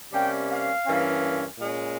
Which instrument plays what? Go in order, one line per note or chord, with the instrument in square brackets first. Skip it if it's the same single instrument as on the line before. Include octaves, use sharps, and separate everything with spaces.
[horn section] C3 G3 A#3 C#4 G5
F5
G2 E3 A#3 C#4
A#2 G#3 C#4